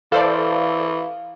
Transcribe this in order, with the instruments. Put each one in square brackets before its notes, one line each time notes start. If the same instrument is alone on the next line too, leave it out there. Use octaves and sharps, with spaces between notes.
[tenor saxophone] E3 [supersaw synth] A4 C5 D5 [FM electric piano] F5